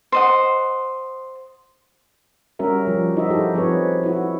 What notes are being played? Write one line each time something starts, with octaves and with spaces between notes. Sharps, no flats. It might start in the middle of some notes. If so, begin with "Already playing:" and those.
C5 D#5 F#5
G3 C#4 F#4 A#4 E5
F3 G4
D#4 E4 F#4 D#5 E5
F#4 G4 A4
F3 C4 G#4 B4 C#5
E4 F#4